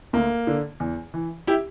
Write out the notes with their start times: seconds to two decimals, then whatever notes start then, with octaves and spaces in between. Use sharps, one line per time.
0.13 D2 A#3
0.47 D3
0.80 E2
1.14 E3
1.47 E4 G4